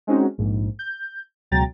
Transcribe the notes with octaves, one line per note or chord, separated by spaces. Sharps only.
G#3 C4 C#4 D#4 F#4
A#1 G#2
G6
C#2 B2 F#3 G5 A#5 A6